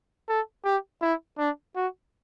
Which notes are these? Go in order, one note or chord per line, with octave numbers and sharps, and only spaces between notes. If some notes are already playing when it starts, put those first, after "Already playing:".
A4
G4
E4
D4
F#4